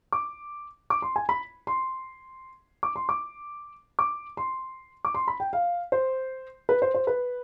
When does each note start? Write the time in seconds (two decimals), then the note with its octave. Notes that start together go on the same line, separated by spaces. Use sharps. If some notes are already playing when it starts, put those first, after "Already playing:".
0.12 D6
0.90 D6
1.02 C6
1.16 G#5
1.29 B5
1.67 C6
2.83 D6
2.96 C6
3.09 D6
3.99 D6
4.37 C6
5.05 D6
5.15 C6
5.28 B5
5.40 G5
5.53 F5
5.92 C5
6.69 B4
6.82 C5
6.94 C5
7.07 B4